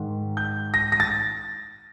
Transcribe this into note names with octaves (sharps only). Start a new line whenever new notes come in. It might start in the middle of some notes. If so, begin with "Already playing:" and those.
Already playing: G#2 D#3
G6
A#6
A#6
A6